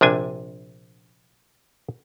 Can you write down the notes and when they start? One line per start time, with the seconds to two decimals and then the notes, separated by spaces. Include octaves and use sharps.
0.01 A#1 C3 D4 G#5